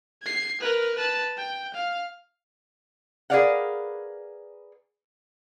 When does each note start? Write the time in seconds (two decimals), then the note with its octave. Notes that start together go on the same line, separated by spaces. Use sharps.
0.23 G#6 C7
0.61 A#4 B4
0.96 B4 A5
1.38 G5
1.74 F5
3.30 G#4 A#4 B4 D5 F5 F#5